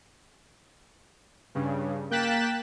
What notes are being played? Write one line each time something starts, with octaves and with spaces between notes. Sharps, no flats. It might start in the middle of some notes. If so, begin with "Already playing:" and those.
G2 C#3
A#3 G5 F#6 A6 B6 E7